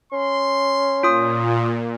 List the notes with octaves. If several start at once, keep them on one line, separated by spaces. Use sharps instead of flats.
C#4 C6
A#2 F4 D#6